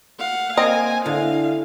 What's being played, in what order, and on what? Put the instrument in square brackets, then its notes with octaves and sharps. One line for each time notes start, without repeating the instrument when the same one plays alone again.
[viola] F5 F#5
[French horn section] A#3 [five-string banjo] C4 D#5 [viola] G#5
[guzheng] D3 [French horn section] E4 [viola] F5